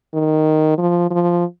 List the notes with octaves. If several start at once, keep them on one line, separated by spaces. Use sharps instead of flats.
D#3
F3
F3